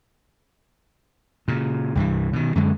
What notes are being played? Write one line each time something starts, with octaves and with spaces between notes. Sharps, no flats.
A#2 C#3
C2 G2 C3 E3
B2 D#3
F#2 D3 G#3